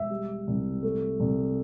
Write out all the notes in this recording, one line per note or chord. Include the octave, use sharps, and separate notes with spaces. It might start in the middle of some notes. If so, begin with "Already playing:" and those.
Already playing: E1 E5
G3
C2
A3
C2